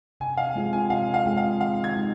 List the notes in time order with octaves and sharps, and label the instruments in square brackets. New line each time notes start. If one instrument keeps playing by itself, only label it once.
[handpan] C3 [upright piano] G#5
[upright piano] F5
[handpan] G#3 C4 F4 G#4
[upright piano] G#5
[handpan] C3 [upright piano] F5
[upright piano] F5
[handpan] G#3 C4 F4 G#4
[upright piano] F5
[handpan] D#3 [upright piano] F5
[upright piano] G#6
[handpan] G#3 D#4